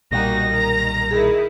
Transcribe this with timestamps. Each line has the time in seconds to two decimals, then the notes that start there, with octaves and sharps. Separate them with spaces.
0.11 B1 A#2 G3 A#3 D#4 F#4 A#6
0.48 D#3 A#5
1.11 D#3 D#4 E4 G#4